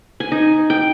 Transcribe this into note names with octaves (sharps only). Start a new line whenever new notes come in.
G#5
D#4
G5